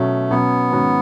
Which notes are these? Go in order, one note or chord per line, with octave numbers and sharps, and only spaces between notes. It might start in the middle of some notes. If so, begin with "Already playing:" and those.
Already playing: B2 F#3 A3 C#4
B2 F#3 B3 C#4
G#2 D#3 F#3 C#4 F#4